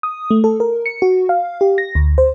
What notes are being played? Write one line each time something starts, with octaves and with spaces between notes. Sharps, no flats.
D#6
A3
A4
A#4
C#7
F#4
F5
G4
A#6
D2
C5